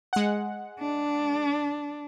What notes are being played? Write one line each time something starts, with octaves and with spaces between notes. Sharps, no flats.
G#3 F#5
D4